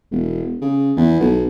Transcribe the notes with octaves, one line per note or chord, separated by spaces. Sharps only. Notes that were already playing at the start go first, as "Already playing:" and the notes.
E1
C#3
E2
B1